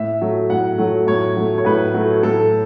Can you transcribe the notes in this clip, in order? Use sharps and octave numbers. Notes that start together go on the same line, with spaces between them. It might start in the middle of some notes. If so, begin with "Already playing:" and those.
Already playing: A2 E5
F#3 A3
A2 F#5
F#3 A3
A2 C#5
F#3 A3
C#5
A2 B4
F#3 A3
A2 A4